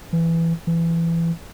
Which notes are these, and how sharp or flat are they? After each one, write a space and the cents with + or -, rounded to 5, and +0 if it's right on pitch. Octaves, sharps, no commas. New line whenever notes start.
E3 +10
E3 +20